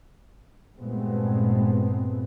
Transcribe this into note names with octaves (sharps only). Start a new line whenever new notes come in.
G2 A#2 G#3 A3 B3 C4